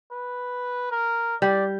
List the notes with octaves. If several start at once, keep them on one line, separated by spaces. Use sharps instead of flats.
B4
A#4
G3 D5